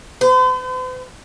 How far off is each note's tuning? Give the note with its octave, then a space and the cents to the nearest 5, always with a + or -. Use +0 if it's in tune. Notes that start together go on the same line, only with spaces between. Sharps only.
C5 -45